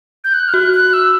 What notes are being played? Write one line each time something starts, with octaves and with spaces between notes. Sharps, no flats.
G6
F#6
F6
F#4 F#6
F#6
E6